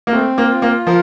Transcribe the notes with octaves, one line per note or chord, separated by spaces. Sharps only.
A#3
A3 C4
A#3
F4
A#3
F3 A#4